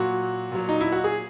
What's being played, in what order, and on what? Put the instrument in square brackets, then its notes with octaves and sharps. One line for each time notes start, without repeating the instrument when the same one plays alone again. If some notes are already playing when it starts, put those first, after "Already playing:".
Already playing: [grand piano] A#2 F#3 F#4
A#2 F#3
D#4
E4
F#4
G#4